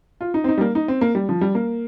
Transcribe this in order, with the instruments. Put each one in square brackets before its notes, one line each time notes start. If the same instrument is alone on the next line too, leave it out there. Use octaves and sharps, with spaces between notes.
[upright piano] F4
D#4
C4
D#4
G3
A#3
D#4
C4
A#3
G3
F3
G3
A#3